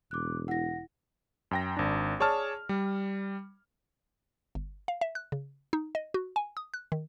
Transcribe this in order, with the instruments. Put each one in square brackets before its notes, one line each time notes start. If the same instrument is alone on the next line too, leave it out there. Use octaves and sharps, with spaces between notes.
[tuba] E1 [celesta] D6 F#6
[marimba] E4 [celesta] F#5 A#6
[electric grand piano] F#2 G5 A#6
G#1 D4
G#4 C#5 D5 A5 F6
G3
[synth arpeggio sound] G1
F5
E5
F#6
C#3
D#4
D#5
F#4
G#5
D#6
F#6
D#3